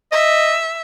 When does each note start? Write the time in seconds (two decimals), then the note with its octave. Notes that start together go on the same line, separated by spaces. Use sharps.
0.12 D#5 E5